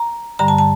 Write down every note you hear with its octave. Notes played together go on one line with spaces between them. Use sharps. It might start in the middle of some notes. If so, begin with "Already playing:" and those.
Already playing: A#5
G2 D3 G3 A#5
A5
A5